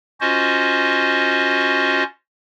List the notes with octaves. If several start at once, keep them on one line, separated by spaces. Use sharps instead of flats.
C#4 F4 F#4 C5 D#5